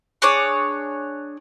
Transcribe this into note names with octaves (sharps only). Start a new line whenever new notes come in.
D4 G#4 C#5 D6